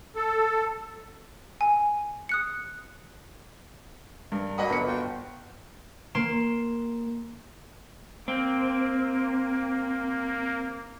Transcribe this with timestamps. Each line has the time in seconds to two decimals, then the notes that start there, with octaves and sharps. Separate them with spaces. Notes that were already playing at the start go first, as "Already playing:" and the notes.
0.16 A4
1.61 G#5
2.29 D#6 F#6 C#7
4.32 G2 A#4
4.58 F#3 A#3 D#5 F#5 B5 D#6
4.70 G1 C#7
4.87 F4 F#4 G5
6.15 A#3 C6 D7 E7
8.28 A#3 C4